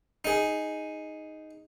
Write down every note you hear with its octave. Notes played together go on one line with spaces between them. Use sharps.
D#4 G#4